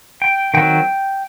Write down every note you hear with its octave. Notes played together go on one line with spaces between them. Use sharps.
G5
D#3 F#3 C4 G5